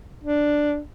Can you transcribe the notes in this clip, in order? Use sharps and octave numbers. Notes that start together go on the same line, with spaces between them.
D4